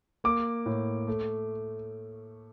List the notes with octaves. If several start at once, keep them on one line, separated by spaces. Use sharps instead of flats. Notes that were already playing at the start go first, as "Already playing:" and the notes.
A#3 D6
A2
A3